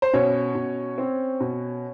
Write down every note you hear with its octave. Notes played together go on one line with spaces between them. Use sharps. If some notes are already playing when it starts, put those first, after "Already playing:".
C5
B2 C#4 C#5
B2
C4
B2